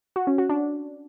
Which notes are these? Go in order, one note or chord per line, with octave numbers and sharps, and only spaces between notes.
F#4
C#4
F#4
D4